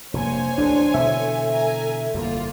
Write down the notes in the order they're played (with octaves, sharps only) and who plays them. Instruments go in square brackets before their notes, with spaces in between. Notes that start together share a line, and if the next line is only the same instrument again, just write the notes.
[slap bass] F1 G2 [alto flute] A#3 [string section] C5 C#5 G#5
[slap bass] A1 D2 [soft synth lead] D4 [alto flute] A4
[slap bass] B2 D3 E3 [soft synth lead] E5
[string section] G#5 A#5
[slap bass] G1 F2 A2 [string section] A#3 F4